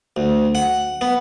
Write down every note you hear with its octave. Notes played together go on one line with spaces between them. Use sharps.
D2
F#5
B3